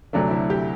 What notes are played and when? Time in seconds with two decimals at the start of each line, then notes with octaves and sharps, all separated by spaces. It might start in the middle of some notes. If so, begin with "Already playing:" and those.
0.13 D2 C3 F#3 A3 D4
0.31 E4
0.50 G4